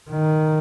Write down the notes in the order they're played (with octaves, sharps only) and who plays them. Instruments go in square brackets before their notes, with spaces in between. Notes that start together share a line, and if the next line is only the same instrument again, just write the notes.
[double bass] D#3